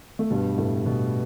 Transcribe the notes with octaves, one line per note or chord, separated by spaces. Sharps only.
A3
G2 B2 G3
A2 A3
B2 B3